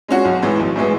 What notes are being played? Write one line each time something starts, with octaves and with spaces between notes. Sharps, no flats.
G#3 C#4 F#4
B1
A2 E3 G#3 B3
B1
A2 E3 G#3 B3